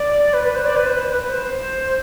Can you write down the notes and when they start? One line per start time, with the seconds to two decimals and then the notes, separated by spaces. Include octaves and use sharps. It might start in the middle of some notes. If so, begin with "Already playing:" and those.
Already playing: D5
0.34 B4
0.44 B4
0.55 C5
0.65 D5
0.76 B4
0.86 C5
0.96 B4
1.13 B4
1.29 C5